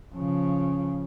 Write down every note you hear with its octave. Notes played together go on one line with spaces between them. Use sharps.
C#3 F3